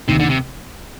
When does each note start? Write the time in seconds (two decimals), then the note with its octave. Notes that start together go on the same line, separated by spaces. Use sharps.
0.08 F1 D#2 C3 D#3 A#3 D#4
0.19 D3
0.30 C3